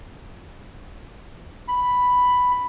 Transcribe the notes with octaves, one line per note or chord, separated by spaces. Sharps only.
B5